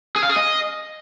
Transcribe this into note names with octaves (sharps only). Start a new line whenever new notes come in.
G#4
F5
G#4
D#5